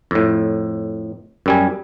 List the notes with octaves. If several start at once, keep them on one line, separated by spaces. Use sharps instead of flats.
F2 A2
F#2 G3 G#5